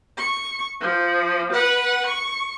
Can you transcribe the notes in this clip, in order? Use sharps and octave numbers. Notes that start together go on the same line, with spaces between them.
C#6
F3
B4 F#5
C#6